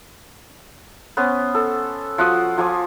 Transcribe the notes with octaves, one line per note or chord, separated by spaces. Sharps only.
B3 C#4 C5
A4
F3 F#4 F#5 D#6
F3 G#5 D6 D#6